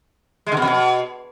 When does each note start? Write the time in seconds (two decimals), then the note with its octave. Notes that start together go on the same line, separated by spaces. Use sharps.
0.46 G#3
0.52 D3
0.57 B2
0.62 F2
0.67 B2